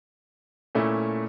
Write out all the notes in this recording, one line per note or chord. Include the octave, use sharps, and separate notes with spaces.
A#2 A3 C#4 E4